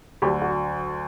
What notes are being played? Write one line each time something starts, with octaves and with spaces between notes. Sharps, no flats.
D2 D3 F#3 G4
F#4